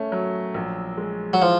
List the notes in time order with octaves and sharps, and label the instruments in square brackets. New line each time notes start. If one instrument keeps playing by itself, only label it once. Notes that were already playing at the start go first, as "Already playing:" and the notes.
Already playing: [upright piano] A3 C#4
F#3
A#1
G#3
[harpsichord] F#3
[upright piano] E3 [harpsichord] F3